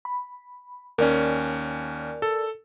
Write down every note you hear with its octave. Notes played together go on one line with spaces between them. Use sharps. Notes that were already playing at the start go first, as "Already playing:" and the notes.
B5
D#2 C#4 A#4 D5 G#5
A4